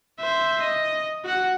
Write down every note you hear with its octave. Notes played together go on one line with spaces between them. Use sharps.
C5 E5
D#5
F#4 F#5